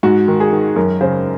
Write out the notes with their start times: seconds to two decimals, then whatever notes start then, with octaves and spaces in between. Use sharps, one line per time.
0.03 G#2 F#4
0.28 D#3
0.40 G#4
0.52 D#3
0.76 F#2 A#4
1.01 C#3 C5